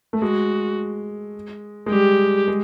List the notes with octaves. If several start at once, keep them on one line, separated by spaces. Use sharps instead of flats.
A3
G#3 F#4
G#3
G3 G4
G#3